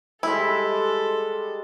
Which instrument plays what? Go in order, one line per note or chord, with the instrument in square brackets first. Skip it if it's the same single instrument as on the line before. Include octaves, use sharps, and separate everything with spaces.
[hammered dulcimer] G3 G#3 [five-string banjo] E4 [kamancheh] A4